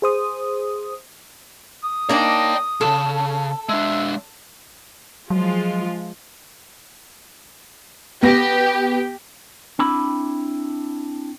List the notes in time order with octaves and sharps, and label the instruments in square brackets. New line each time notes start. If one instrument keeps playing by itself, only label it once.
[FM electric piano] G#4 C5 D#6
[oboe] D#6
[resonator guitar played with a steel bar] A#3 D4 D#4 [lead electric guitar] C#5 G5
[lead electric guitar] B1 C#3 [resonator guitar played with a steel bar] A4
[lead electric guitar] G#3 D4 [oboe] E5
[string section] F3 G#3 F4 [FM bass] F#3
[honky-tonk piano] B3 A#6 [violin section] G4
[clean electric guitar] C4 D4 E4 B5